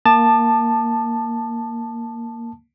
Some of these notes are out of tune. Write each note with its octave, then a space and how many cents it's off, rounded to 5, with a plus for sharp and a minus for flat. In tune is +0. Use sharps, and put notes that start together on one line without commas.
A#3 +0 A5 +0 D6 +45